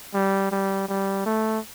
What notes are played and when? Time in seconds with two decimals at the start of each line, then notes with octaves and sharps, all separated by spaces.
0.14 G3
0.52 G3
0.89 G3
1.26 A3